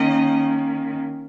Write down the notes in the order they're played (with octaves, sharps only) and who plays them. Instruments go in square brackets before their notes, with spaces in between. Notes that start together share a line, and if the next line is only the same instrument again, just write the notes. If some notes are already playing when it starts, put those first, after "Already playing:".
Already playing: [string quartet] D#3 A#3 C#4 D#5